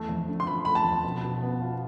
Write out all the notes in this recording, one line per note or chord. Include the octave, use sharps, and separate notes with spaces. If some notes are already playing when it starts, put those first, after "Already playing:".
Already playing: E2 A3
F2
D3
C6
F3 B5
A3 B5
A5
F2
B2
B2
B3
F4